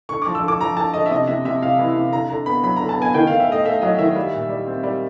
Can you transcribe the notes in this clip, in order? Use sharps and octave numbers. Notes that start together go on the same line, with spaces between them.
D3 C#6
D6
F3
E6
D3 D6
F3 A#5
D3 A5
D3 D#5
E5
C3 D#5
C3 E5
C3 E5
C3 F5
E3
C3
D3 A#5
D3 A#5
B3 B5
F#3 B5
D3 A#5
A5
B3 G#5
D#3 G5
D#3 F5
E5
A3 D#5
A3 E5
F#3 D#5
D#3 E5
G3
A#2
G3
C4
G3